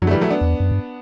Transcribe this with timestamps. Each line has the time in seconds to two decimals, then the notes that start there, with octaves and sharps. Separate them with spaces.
0.02 F#2 D3 F#3
0.07 A3
0.11 E3 G3
0.21 F#3 A3
0.30 B3 D4
0.41 E2
0.60 F#2
0.71 G2